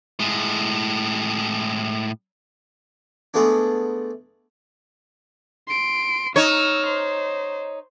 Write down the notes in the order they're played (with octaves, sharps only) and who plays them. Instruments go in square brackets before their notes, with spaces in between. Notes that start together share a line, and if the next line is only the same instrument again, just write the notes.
[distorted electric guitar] A2 G#3
[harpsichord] G#3 A3 B3 D4
[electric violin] C6 D7
[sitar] D#4 C#5 [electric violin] E6 F6
[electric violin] C5